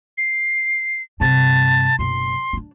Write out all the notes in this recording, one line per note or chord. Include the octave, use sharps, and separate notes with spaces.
C7
G2 C3 A5
F#1 B2 C6
C#4 D4